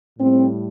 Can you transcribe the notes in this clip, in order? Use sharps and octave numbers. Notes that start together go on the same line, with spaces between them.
A2 G3 C4